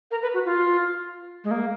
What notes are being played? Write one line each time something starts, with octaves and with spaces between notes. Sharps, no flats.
A#4
B4
F#4
F4
G#3
A#3